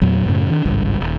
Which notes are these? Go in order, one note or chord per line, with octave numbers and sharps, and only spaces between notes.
E2 A#2 F#3
F#2 A2 C#3
D#3 D4
G#1 C#2 G2
D#1